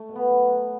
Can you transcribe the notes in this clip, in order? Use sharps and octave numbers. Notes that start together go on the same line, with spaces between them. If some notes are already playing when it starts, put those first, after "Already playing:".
Already playing: A3
B2
B3
F#3